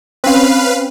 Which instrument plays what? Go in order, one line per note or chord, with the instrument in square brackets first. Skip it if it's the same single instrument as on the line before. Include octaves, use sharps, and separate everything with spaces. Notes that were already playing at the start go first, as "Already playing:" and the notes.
[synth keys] C4 C#4 [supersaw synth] B4 F5